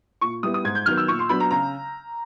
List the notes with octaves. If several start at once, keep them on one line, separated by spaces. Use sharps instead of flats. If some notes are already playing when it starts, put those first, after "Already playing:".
A#2 C#6
G3 B3 E4 D#6
D#6
G#2 G#6
G6
D#3 F#3 B3 F6
E6
A#2 C#6
C6
F#3 B3 D4 B5
A#5
C#3 A#5